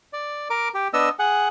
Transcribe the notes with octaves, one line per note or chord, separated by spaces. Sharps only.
D5
A#4 D6
G4
B3 D4 D#5 E6
G#4 F#5